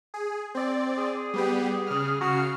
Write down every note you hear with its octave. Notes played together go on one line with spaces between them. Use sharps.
G#4
C4 D5
G#4
G3 B3 G4
C#3 F6
C#3 F#4 F6 C7